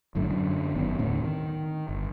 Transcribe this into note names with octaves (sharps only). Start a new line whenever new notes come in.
G1 F#2 A2 D3
F#2 D3
G1 D#3 B3
D#1 A2 D3 C4
D#3
G1